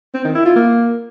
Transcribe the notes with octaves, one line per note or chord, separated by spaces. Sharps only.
C4
D#3
E4
F4
A#3